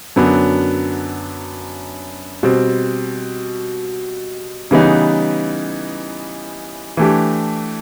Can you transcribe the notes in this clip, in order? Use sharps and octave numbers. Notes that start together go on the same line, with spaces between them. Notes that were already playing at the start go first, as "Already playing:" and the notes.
F#2 D3 F#3 B3 D4
B2 G3 C4
C#3 E3 G3 B3 D#4
E3 A3 D4 G4